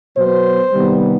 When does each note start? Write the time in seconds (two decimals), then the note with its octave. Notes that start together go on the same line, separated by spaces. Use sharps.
0.16 B2 F#3 B3 C5
0.73 C3 D#3 G3 B3